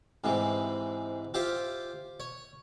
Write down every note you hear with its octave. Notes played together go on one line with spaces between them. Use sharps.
G#2 C3 E3
F4 G4 C5 E5
C#5